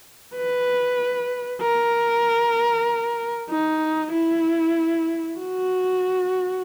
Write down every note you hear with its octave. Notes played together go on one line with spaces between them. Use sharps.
B4
A#4
D#4
E4
F#4